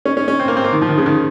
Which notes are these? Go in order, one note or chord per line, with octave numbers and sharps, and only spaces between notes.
C#4
C#4
C#4
C4
A#3
C4
A#3
D#3
F3
D#3
C#3
D#3